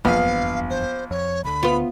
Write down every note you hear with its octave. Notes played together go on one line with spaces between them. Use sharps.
F1 A#1 E2 G2 B3 F5
C5
F2 C#5
D2 D3 B5
B3 F4